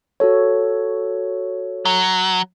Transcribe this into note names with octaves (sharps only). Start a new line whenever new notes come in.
F#4 A4 C#5
F#3